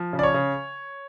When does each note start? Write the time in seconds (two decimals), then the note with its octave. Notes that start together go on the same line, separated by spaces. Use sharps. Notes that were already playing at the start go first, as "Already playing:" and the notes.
Already playing: F3
0.13 C#3
0.19 D5
0.23 C#5
0.34 C#3